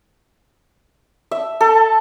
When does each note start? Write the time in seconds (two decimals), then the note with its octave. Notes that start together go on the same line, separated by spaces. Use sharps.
1.31 E5
1.61 A4